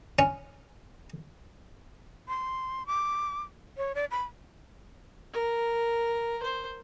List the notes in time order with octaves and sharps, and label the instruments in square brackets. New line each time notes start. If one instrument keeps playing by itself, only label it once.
[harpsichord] C#4
[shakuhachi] C6
D6
C#5
D5
B5
[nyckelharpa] A#4
C5